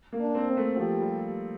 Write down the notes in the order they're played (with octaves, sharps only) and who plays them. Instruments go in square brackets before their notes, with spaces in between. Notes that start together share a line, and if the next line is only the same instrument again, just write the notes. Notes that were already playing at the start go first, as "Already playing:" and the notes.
[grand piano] A#3
[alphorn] D4
[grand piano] C4
[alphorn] C4
[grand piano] A3
[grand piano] F3 [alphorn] G4
[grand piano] G3